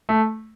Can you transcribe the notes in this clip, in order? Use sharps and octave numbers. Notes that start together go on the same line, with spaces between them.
A3